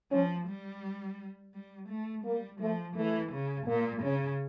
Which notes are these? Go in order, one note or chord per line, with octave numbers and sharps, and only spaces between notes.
F3 C#4
G3
G3
A3
G3 A#3
F3 A3
E3 A3
C#3
A#2 A#3
C#3 C#4